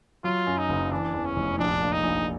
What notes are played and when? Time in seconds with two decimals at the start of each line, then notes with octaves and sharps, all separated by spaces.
0.24 F#3 F4
0.47 F#2
0.58 D#4
0.69 F#1
0.91 E3 D4
1.14 E2
1.25 C#4
1.36 F1
1.58 A#1 D4
1.80 A#2
1.92 D#4
2.03 A#1